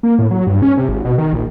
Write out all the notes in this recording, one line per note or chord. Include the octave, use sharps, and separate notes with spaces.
A#3
A2
F#3
G2
C#4
C3
G#1
B2
D#3
A#1